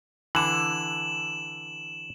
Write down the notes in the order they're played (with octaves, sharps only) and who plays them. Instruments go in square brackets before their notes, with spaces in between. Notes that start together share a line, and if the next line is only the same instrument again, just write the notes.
[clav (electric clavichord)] D3 E3 [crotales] E7 F#7